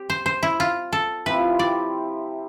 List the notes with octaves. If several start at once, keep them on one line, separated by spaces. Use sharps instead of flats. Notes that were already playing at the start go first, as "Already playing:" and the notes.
Already playing: C4 G4
C5
C5
E4
F4
A4
C3 F3 C4 E4 B4
D5